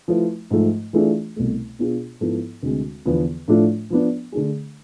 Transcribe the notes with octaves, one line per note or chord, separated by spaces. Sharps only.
F3 A3 E4 B4
G#2 F3 A3
E3 A3 D4 F4 G#4
C2 B2 A3
B2 B3 D4 F4 G#4
G#2 F3 B3 E4 A4
D2 C3 G#3
E2 D3 F3 B3
A2 F3 A3 D4 F4
F3 B3 D4
D3 A3 D4 G#4